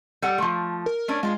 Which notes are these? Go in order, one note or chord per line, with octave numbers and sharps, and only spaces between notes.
G3 A4 F#5
F3 A3
A#4
A3 C#4 D4
G#3 F4 G4 G#4